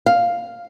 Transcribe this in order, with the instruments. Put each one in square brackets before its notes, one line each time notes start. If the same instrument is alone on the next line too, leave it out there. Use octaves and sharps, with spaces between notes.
[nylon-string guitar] F5